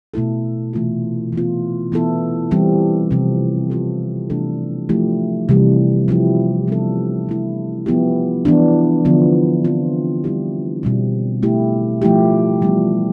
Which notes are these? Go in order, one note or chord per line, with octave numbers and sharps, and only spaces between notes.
B2 A3 E4 A4
C3 E3 A3 C4 F4
E3 B3 F4
E3 B3 E4 A4
E3 G3 C4 G4
C3 F3 C4
F3 C4 F4 A4
C3 E3 A3 D4 A4
F3 A3 E4 G4
C3 E3 G3
F3 C4 E4 G4
C3 G3 B3 D4 A4
F3 A3 E4
F3 B3 E4 G4
E3 B3 D4
D3 F3 B3
F3 C4 F4
G3 B3 E4 G4
B2 G3 C4
A3 E4 G4
F3 A3 E4 G4
E3 G3 B3 F4